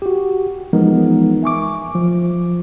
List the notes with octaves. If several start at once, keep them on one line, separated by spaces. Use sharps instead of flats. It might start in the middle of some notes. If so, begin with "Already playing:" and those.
F#4 G4
E3 F3 G#3 B3 D#4 A#4
E5 G#5 C#6 D6
F3